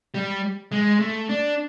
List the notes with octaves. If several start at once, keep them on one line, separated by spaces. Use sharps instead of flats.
G3
G#3
A3
D4